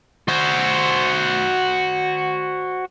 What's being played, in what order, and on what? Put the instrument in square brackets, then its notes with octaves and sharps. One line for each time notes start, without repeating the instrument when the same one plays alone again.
[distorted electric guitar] F#4 C5